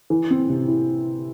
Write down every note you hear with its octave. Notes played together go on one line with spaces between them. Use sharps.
E3
C4
C3
E4